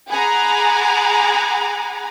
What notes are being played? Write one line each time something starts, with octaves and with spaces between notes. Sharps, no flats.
G#4 F#5 G#5 A#5 B5 D6